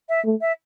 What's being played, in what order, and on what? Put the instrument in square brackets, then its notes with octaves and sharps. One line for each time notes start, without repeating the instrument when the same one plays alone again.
[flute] E5
[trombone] A3
[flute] E5